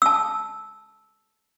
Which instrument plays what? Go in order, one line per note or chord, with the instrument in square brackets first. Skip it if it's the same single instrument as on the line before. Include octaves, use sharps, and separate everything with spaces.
[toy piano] A5 E6